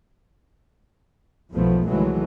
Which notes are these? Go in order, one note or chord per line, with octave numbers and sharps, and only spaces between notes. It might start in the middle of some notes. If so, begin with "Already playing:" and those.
B1 E2 F3 A3 B3
C2 D#3 E3 F#3 G#3 A3